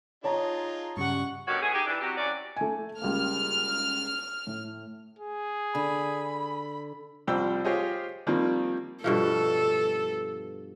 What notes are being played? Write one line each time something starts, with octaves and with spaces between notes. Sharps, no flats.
D#4 F4 G#4 C#5 A5 A#5
G2 C#3 G3 F#5 C#6
B2 D3 D#3 F#4 G4 C#5
A3 B3 E4 G#4
D#4 G4 G#4
E3 D4
C3 F#3 F#4 G4
E3 F#3 C#4 D5
A3 G#5
C#2 G3 A#3 F6
A2
G#4
D3 B5
C2 F3 G3 C5 G5 E6
F4 G4 G#4 C5 C#5 D#5
D#3 F3 G3 A#3 C4
G2 B2 F3 A4